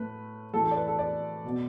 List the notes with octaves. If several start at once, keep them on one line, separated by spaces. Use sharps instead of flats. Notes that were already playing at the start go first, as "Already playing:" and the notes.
Already playing: A2 A3 B4
A2 E3 A3 A4
A4
D5
B4
A4
D5
B2 B3